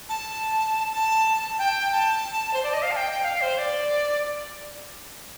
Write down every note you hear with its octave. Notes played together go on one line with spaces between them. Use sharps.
A5
A5
G5
A5
C5
D5
D#5
F5
A5
G5
F5
C5
D5